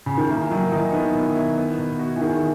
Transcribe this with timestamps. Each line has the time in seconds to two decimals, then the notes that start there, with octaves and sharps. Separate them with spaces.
0.06 C#3
0.17 D#3
0.29 E3 A#3
0.51 D#3 F#3
0.72 E3 D#4
0.93 D#3 B3
1.14 B2
1.36 E4
1.57 B3
1.78 B2
1.99 F#4
2.16 E3
2.21 D#3 G#4